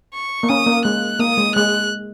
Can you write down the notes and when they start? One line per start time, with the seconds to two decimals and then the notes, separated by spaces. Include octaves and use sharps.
0.14 C#6
0.43 A#3
0.49 C#4 D#6
0.66 A#3
0.85 G#3 F#6
1.20 A#3 D#6
1.38 G#3
1.55 G#3 F#6